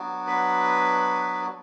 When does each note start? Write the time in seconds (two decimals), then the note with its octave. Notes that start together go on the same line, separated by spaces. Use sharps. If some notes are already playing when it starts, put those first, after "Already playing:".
Already playing: F#3 B3 D4 F#4
0.27 B4